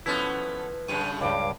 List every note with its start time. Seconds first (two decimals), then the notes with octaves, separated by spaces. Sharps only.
0.06 F3 A3 B3 C#4 E4 B4
0.88 F#2 A2 C#3 D#7
1.21 C#2 G2 F5 D6